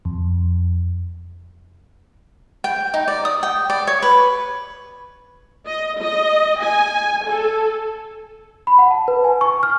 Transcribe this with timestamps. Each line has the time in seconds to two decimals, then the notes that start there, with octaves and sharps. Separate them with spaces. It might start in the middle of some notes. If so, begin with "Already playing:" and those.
0.05 F2
2.64 G5
2.94 D#4
3.08 D5
3.25 D#6
3.43 G5
3.70 D5
3.87 C#5
4.02 B4
5.67 D#5
6.00 D#5
6.64 G#5
7.26 A4
8.67 B5
8.79 F#5
8.91 A5
9.08 B4
9.24 G#5
9.41 C#6
9.63 F6